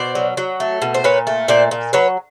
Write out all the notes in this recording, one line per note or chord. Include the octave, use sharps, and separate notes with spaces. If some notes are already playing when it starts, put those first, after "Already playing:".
Already playing: B2 C5 D5
F#3
F#3
A3
B2
C5
A#2 B4 C#5
A3
A#2 C5 D5
A#2
F#3 B4 C#5